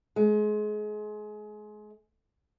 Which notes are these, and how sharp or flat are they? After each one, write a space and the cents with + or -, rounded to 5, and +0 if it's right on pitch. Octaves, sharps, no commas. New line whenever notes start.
G#3 +30